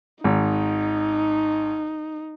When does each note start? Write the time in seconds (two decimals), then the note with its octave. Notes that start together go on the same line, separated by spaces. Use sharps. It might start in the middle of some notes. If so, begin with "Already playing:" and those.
0.24 G#1 D#4